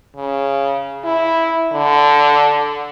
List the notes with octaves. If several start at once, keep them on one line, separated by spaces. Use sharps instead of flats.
C#3
E4
D3